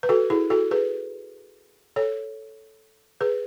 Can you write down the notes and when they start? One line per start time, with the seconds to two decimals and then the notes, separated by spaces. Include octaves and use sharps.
0.03 B4
0.09 F#4 A4
0.30 E4 G#4
0.50 F#4 A4
0.71 G#4 B4
1.96 A4 C#5
3.21 G#4 B4